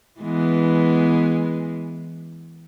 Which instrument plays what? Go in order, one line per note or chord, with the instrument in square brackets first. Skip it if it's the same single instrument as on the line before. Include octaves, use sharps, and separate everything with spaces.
[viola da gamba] E3 G#3 B3